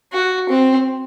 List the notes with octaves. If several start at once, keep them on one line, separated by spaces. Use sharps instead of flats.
F#4
C4